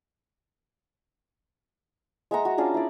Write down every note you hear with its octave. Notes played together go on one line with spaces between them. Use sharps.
G#3 E5 F#5 A#5
F#4
C#4 D4 F4 G#4
E4 D5